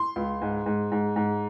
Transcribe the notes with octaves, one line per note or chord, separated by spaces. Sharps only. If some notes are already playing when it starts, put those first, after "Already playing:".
Already playing: C6
C#2
G#2
G#2
G#2
G#2